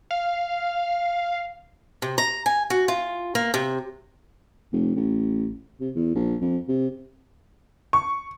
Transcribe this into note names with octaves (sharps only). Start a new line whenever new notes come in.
F5
C3
A#5
G#5
F#4
F4
A#3
C3
F1
A1
C3
E2
A#1
F2
C3
C#6